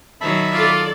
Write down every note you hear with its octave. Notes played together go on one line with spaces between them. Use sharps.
D#3 F#3 D#4 E5 A5 B5
F4 A4 D5